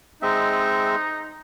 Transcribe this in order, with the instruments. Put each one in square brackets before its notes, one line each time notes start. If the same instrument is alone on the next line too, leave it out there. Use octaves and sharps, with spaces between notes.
[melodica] G#3 C4 E5 [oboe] D#4